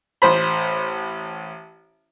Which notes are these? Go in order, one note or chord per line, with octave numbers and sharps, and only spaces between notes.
A1 C5 B5